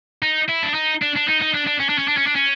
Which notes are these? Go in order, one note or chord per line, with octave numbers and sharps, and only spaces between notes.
D#4
E4
D4
D#4
D4
D4
D#4
D#4
D4
D4
C#4
D4
C#4
D4
C#4
D4
C#4